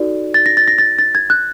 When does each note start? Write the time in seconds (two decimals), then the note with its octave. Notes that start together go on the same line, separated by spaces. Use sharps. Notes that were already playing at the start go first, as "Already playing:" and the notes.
Already playing: D#4 F#4 A4 D5
0.34 A6
0.46 A#6
0.57 A6
0.68 A#6
0.78 A6
0.99 A6
1.15 G#6
1.30 F#6